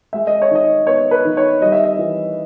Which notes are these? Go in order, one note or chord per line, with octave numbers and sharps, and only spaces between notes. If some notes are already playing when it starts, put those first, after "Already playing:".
G#3 E5
D#5
C#5
D#3 D#5
B3 C#5
B4
D#3
C#5
G3 D#5
E5
D#5
E3